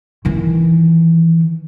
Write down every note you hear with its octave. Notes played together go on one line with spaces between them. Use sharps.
D#3 E3